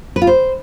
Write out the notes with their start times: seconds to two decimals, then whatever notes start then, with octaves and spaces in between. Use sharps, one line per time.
0.16 B4
0.22 F4
0.27 C5